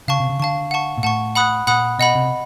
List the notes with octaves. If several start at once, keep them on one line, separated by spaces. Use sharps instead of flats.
C#3 F5 A5 C#6
C3
C#3
D3 F5 A5 C#6
F#5 A5 C#6
A#2
A2 F#5 A5 C#6
F#5 B5 D#6 F#6
A#2 F#5 B5 D#6 F#6
B2 D#5 F#5 B5
C3